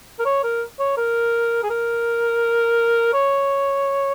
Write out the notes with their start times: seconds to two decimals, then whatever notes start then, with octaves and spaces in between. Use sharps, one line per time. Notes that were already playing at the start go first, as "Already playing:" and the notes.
0.19 A#4
0.25 C#5
0.43 A#4
0.79 C#5
0.97 A#4
1.63 G#4
1.70 A#4
3.14 C#5